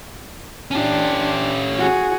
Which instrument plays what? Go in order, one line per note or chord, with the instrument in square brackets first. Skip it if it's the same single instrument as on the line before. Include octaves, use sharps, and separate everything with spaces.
[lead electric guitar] C#4 G4 [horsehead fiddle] D4
[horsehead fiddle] F#4 G#4